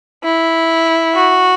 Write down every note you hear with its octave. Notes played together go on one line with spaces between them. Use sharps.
E4
F#4